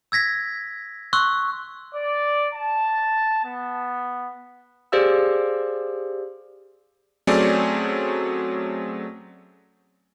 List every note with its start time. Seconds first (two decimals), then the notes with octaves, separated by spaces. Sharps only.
0.12 E6 G#6 A#6 B6
1.13 C6 C#6 E6 F#6
1.94 D5
2.53 A5
3.45 B3
4.92 G4 G#4 C5 D5 F5 E6
7.27 F#3 A3 C4 C#4 G#4 D5